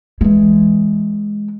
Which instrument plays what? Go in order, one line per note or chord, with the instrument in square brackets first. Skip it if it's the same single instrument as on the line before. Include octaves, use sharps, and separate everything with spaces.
[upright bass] E3 G#3